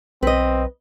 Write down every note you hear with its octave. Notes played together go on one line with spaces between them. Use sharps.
B1 C4 B4 D#5